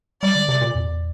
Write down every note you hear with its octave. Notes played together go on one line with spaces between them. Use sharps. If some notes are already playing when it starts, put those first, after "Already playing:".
G3 D5
D3
C3
A#2
E2